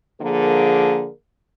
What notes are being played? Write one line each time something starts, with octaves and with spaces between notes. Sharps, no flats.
D3 F3 A#3 G#4 A#4